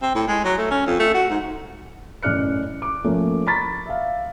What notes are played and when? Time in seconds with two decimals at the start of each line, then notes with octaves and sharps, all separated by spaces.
0.02 C4
0.15 A2
0.28 G#3
0.44 F#3
0.58 A3
0.71 C#4
0.87 F2
0.99 A3
1.14 F#4
1.30 G#2
2.23 A1 F#2 D5 F6 F#6 C#7
2.82 D6
3.04 F3 A3 A#3 C#4
3.47 A#5 B5 C#6 A6 B6
3.86 E5 F5